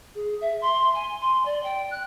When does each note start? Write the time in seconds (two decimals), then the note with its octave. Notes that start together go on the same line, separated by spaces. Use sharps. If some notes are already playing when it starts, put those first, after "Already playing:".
0.15 G#4
0.41 E5
0.62 C6
0.95 G#5
1.20 C6
1.45 D5
1.63 G5
1.91 F#6